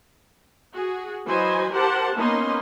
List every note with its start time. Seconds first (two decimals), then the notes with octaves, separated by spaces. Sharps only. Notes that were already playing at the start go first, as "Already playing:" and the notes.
0.73 F#4 G#4
1.26 E3 F#3 C5 D#5 G#5 B5
1.72 G4 A#4 C5 F#5 A5
2.15 A#3 B3 C#4 D#4 D#5 C6